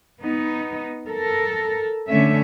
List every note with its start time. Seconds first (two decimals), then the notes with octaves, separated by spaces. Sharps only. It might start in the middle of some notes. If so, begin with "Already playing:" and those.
0.22 B3 D#4
1.07 A4 A#4
2.08 D3 A3 C#4 E5